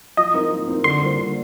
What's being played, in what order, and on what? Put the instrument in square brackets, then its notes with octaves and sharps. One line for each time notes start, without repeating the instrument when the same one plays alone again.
[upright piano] F3 [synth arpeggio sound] D#5
[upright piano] C4 D#4 A#4
F3
C4 D#4 A#4
[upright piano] D3 [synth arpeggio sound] C6
[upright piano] G3 A#3 F4 C5
D3